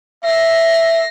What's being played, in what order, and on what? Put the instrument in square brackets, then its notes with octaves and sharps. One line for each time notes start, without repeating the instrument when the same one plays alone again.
[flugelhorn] E5 [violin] A#6 C7